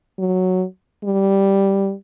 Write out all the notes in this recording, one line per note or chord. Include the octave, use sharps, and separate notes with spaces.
F#3
G3